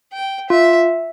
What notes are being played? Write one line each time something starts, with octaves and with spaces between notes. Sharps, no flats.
G5
F4 E5